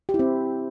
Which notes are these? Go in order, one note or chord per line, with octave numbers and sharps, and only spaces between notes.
G4
E4
C4